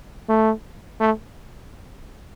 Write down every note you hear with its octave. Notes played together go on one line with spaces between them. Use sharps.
A3
A3